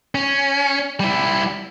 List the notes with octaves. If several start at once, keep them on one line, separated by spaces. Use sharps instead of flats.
C#4
G3 E4